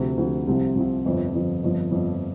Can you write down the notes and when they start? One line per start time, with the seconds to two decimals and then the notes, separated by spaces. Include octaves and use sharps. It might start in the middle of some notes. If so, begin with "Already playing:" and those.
Already playing: D2 C3 F3
0.18 D2 C3 F3
0.47 C2 C3 F3 C4
0.75 C2 C3 F3 C4
1.05 G1 F2 F3
1.33 G1 F2 F3
1.63 G1 F2 F3
1.91 G1 F2 F3